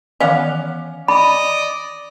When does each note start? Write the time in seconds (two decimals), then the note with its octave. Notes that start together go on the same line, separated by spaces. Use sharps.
0.20 D#3 E3 B3 C#4 F5 F#5
1.08 D5 D#5 B5